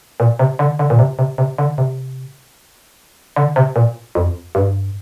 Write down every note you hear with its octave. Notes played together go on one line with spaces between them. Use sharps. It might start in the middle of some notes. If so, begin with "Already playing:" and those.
A#2
C3
D3
D3
A#2
C3
C3
C3
D3
C3
D3
C3
A#2
F2
G2